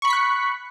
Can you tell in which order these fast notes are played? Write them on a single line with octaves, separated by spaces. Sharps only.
C#6 B5 C#7 B6 F#6